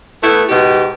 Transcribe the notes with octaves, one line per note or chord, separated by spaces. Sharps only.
A3 B3 E4
G#2 B2 G4